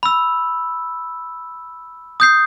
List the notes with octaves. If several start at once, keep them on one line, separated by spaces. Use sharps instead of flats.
B5 E6
D#6 G6 C7